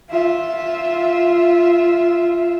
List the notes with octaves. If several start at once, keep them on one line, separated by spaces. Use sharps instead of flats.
F4 E5